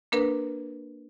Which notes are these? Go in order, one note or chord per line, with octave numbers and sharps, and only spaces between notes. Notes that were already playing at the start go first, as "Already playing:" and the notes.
A#3 D4 A#4 B4